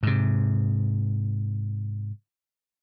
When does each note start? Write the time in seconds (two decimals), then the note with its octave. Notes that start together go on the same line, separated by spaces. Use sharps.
0.03 G#2 C3